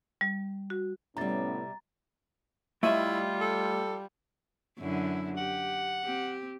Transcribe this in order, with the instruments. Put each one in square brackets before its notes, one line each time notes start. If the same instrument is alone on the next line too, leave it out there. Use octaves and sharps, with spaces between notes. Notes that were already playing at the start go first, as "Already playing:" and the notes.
[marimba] G3
F#4
[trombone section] A2 B3 [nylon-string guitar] C3 G3 [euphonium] C#4 [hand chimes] A#5 A6
[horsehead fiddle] G3 [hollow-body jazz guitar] A3 D#5 E5 [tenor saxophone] E4 [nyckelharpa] F4
[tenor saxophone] A4
[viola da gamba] F#2 D3 E4
[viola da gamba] G4 [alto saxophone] F#5
[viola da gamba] C4 G4